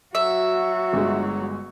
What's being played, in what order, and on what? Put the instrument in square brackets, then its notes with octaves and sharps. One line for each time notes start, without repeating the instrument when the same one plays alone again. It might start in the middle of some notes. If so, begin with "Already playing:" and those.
[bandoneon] F#3 [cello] F#4 [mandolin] E5
[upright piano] G1 G#3